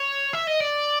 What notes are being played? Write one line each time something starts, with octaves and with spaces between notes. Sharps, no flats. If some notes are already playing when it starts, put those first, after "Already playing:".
Already playing: C#5
E5
D#5
D5